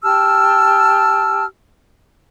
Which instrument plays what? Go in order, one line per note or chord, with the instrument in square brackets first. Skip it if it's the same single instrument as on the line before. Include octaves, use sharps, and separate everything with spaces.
[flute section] G4 A5 E6 F6